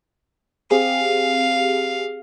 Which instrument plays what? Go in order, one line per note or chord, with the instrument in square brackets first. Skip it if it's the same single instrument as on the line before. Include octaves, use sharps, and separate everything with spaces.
[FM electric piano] C4 G4 G#4 [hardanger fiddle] F5